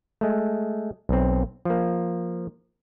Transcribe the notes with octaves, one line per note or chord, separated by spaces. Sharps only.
G#3 A3
B1 C4
F3 A#3